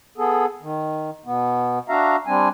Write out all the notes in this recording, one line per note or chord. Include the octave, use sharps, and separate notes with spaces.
B3 G#4 A4
D#3
B2 B3
D4 F#4 E5 F5 A#5
G3 C4 D4 G#5